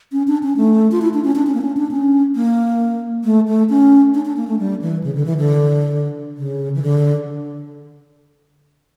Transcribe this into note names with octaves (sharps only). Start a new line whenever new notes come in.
C#4
D4
C#4
A3
F4
E4
D4
C#4
D4
C#4
A#3
C#4
D4
C#4
A#3
A3
A3
C#4
D4
D4
A#3
A3
G3
E3
C#3
D3
E3
D3
C#3
E3
D3